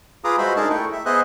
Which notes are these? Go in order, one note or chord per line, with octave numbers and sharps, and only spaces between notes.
F4 G#4 B4 A#5 D6 D#6
G#3 F#4 C5 E5 B5
D4 D#4 G#4 A#4 A5
A3 E4 G5 C#6
E5
B3 G#4 C5 D#5 E5 F#6